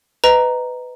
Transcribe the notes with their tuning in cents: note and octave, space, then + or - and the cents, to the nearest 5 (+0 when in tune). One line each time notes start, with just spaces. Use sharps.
B4 +15 D#5 +0 A#5 +0